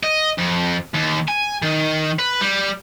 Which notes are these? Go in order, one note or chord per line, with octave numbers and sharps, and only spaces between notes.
D#5
F2
D#2
G#5
D#3
B4
G3